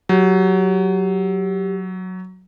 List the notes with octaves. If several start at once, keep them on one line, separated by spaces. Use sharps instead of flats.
F#3 G4